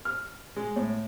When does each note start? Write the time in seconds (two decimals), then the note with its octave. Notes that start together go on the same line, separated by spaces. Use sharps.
0.05 F6
0.56 G#3
0.76 A2